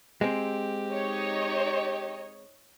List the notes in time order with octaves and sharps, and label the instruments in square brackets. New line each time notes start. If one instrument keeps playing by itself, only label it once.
[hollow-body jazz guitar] G#3 C4 [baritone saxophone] G4
[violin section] D#4 C#5 D#5